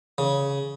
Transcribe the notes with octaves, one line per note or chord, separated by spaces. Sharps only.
C#3